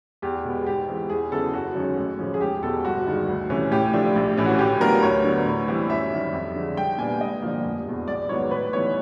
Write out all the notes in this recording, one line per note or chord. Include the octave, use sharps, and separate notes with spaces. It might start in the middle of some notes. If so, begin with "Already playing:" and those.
E2 G4
B2 G#3 B3
G#2 G4
E3 G#3 C4
E2 G#4
C#3 F#3 B3 E4 A4
F#1 F#4
F#2 D#3 G#3 C#4
A1
A2 F3 G#3 C#4
G#4
E1 G4
E2 B2 G#3 A4
G1 F#4
G2 D#3 G#3
D2
C3 E3 A3 C#4
A2 G4
F3 A3 D4 F4
A#1
A2 E3 A3 C#4
F#4
A2 G4
F#3 B3 D4 F4 A#4
D2 C#5
D3 F#3 B3
A2
E3 G3 C4
F#2 E5
D#3 G3
F2
D3 F3 G#3
C2 G5
A#2 G3 B3 D4 G#5
G#1 D#5
G2 D3 F3 A#3
F1
E2 B2
A#1 D5
G#2 D#3 F#3 B3 C#5
A2 B4
E3 G3 B3 D#4 C#5